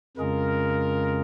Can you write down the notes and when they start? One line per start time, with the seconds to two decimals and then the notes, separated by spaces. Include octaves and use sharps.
0.17 F2 C#3 G#3 C#4 F4 G#4 A#4